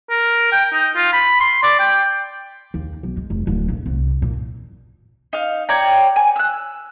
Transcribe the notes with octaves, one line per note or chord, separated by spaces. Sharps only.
A#4
G5
D#4
F4
B5
C6
D5
G5
D#2
B1
G#3
F1
D1
A#1
C2
A#2
D#4 F5
C#5 D5 G5 A#5
G#5
E6 F#6